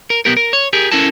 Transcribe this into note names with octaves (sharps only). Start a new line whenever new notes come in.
A#4
B1 B3 G4 A#4
A#4
C#5
G4 G#4 A#4
C#4 E4 A4 A#4 A5